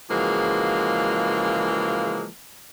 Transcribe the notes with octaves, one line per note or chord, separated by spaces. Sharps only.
C#3 E3 F3 G#3 A#3 F#4